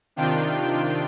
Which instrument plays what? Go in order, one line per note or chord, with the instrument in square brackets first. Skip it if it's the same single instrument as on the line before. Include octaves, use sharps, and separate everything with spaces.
[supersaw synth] C3 D#3 D4 F4 G5